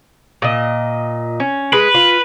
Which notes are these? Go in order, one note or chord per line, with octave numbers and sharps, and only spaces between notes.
A#2 D#5
C#4
G#3 B4
F4